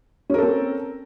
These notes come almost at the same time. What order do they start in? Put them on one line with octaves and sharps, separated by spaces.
C#4 A#4 A4 C4